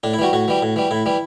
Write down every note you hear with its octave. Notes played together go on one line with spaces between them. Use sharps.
A2 D4
E4
E3 G3 F#4
A2 F#4
E3 G3
A2
E3 G3
A2 E4
E3 G3